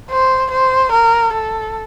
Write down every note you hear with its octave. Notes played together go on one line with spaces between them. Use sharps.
C5
C5
A#4
A4